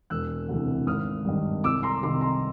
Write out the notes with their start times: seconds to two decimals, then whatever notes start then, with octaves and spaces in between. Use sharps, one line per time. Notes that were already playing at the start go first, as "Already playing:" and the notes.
0.10 E1 E6 F#6
0.48 D2 C3 E3
0.87 G#1 D#6 F6
1.25 G2 D#3
1.64 C2 D6 E6
1.83 A#5 C6
2.03 C3 D#3 C6 D6
2.21 A#5 C6